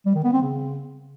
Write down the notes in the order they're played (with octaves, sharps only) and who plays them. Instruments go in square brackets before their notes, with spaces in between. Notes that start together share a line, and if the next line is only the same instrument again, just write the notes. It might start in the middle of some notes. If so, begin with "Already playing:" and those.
[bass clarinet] G3
D#3
B3
C4
C#3